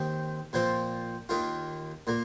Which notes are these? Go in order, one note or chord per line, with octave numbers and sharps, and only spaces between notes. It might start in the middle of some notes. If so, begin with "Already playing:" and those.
Already playing: D#2 D#3 C4
A#2 F3 C4
D#2 D#3 A#3 F4
A#2 A#3